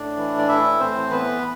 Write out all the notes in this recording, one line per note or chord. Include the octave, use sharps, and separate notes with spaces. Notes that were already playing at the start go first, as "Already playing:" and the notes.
Already playing: A2 D4 D5
E3
D5
A2 E4 E5
A2 C4 C5
E3 B3 B4